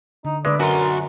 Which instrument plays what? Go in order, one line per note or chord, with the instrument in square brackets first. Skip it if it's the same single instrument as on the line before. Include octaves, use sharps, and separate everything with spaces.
[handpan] D3 [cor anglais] D#4
[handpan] D3 B4 E5 [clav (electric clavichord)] G#3 [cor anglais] D5
[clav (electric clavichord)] F#2 [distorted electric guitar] F#4 C6 [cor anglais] A#4